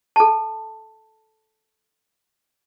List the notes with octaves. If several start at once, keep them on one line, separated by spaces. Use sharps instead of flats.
A4 A5